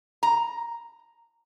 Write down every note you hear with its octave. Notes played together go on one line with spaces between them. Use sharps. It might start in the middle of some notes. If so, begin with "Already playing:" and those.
A#5